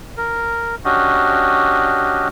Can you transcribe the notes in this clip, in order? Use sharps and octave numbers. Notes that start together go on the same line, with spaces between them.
A#4
C#4 D4 F#4 G4 D#5